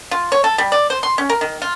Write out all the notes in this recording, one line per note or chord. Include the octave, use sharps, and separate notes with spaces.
F4
C#5
A4
G3
D5
C5
C6
C#4
A#4
D#3
F4